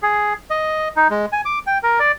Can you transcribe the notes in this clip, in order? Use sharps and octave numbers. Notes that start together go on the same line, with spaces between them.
G#4
D#5
D#4
G#3
G#5
D6
G5
A#4
D5